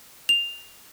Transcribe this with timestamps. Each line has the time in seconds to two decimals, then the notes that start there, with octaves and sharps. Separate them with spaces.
0.29 F7